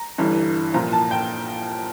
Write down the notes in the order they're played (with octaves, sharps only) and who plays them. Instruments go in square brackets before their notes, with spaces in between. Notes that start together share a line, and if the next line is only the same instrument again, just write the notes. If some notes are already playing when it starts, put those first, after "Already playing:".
Already playing: [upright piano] A#5
G1 G2 E3
C2 A#2 F3 A#5
A5
G5